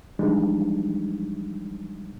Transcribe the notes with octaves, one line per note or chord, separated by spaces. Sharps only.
E3 F3 G3 G#3 D4 D#4